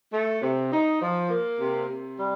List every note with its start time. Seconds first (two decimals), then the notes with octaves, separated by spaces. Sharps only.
0.12 A3
0.41 C3
0.71 D#4
1.00 F3
1.29 A#3
1.58 C3
1.88 C3
2.17 G3